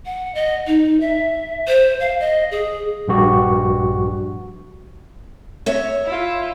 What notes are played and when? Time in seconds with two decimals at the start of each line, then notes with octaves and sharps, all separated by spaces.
0.06 F#5
0.35 D#5
0.67 D#4
1.00 E5
1.67 C5
2.00 F5
2.20 D#5
2.51 G#4
3.08 A#1 G2 F#4 G4
5.66 C#5 E5
6.05 E4 F4